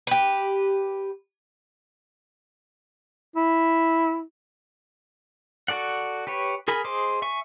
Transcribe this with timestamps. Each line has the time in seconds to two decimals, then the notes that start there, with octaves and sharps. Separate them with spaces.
0.07 G4 B4
3.36 E4
5.68 F#4 A4 D5 F#5
6.27 G4 B4 C#5
6.68 G#4 A#4 G#5 B5
6.84 G#4 C5 D#5 D6
7.22 E5 G#5 C#6